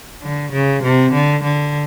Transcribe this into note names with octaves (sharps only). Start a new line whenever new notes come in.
D3
C#3
C3
D3
D3